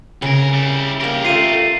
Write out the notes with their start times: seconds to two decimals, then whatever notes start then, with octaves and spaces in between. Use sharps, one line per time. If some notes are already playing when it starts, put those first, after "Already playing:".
0.22 D2 C#3 A#4
0.53 G3 E4
1.01 G3 A#3 G4 A#4
1.25 A3 F4 C7 D#7